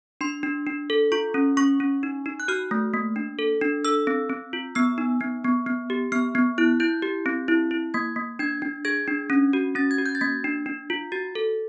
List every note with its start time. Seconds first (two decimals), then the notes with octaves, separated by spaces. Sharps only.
0.21 D4 C6
0.43 D4
0.67 D4
0.90 A4
1.12 F4 C#6
1.34 C#4
1.57 C#4 C#6
1.80 C#4
2.03 D#4
2.26 D#4
2.40 F#6
2.48 F#4 F6
2.71 A3
2.94 A#3
3.16 D4
3.39 A4
3.61 D4
3.85 A4 E6
4.07 C4
4.30 C4
4.53 F4
4.75 B3 E6
4.98 D#4
5.21 B3
5.44 B3
5.67 B3
5.90 G4
6.12 B3 F6
6.35 B3
6.58 E4 F#6
6.80 E4 G6
7.02 G4
7.26 C4
7.48 E4
7.71 E4
7.94 A#3 G#6
8.16 A#3
8.39 D4 G#6
8.62 D4
8.85 G#4 G#6
9.08 D4
9.30 C#4
9.53 F#4
9.75 C#4 A6
9.91 G#6
9.98 F#4
10.06 G6
10.15 A6
10.21 A#3 G#6
10.44 D4
10.66 D4
10.90 F4
11.12 F#4 A6
11.35 A4